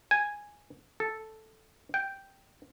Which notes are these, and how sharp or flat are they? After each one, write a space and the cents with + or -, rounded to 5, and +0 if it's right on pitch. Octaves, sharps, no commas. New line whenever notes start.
G#5 -5
A4 +0
G5 -5